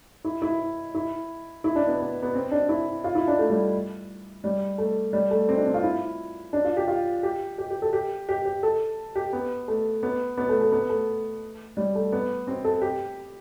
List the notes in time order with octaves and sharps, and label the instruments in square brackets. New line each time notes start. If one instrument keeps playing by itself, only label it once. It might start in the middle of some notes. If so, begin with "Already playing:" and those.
[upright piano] E4
E4
E4
E4
D4
B3
B3
B3
C4
D4
E4
F4
E4
D4
A3
G3
G3
A3
G3
A3
C4
D4
C4
F4
E4
D4
F4
G4
F4
G4
G4
G4
A4
G4
G4
G4
A4
G4
B3
A3
B3
B3
A3
A3
B3
A3
G3
A3
B3
C4
A4
G4